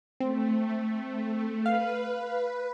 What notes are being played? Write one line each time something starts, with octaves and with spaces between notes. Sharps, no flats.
A3 C4
B4 F5